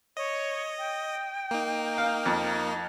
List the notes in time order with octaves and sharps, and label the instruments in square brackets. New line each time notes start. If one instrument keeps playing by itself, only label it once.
[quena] C#5 [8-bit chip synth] D#5
[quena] G5
[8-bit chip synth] A#3 D#4
[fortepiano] F5
F2